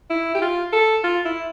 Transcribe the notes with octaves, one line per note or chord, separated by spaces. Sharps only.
E4
G4
F4
A4
F4
E4